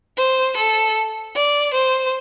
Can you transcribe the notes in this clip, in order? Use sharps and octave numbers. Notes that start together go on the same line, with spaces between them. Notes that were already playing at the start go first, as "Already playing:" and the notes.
C5
A4
D5
C5